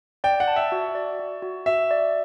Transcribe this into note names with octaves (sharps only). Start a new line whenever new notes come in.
D5 G5
F#5
A5
E5
F#4
D5
F#4
F#4
F#4 E5
D5